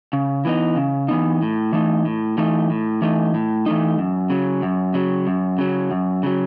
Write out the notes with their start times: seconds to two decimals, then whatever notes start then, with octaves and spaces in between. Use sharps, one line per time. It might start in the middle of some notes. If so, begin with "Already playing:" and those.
0.13 C#3
0.45 E3 B3 D#4
0.76 C#3
1.08 E3 B3 D#4
1.42 A2
1.73 E3 A3 D#4
2.05 A2
2.38 E3 A3 D#4
2.70 A2
3.02 E3 A3 D#4
3.34 A2
3.66 E3 A3 D#4
3.98 F#2
4.30 C#3 F#3
4.62 F#2
4.94 C#3 F#3
5.27 F#2
5.58 C#3 F#3
5.91 F#2
6.23 C#3 F#3